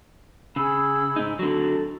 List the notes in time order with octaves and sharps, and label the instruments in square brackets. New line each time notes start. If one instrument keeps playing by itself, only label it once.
[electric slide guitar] C#3 [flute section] G#4 B5 E6
[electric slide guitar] G#2 D#4
[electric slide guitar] D3 F#3 [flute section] A4